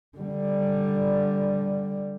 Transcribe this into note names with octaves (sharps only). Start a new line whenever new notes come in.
D3 G3